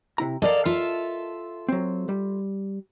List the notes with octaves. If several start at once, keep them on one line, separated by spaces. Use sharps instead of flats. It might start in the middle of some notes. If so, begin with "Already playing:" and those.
C3 E4 A#5
A4 A#4 D5 D#5 F5
F4 A4 E5
F#3 C4
G3